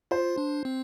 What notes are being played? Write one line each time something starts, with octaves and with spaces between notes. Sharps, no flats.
F4 C5
D4
C4